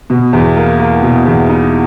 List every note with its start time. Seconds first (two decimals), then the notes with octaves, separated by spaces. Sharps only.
0.10 B2
0.33 E2
0.56 A#3
0.80 A#3
1.03 B2
1.26 E2
1.49 D#4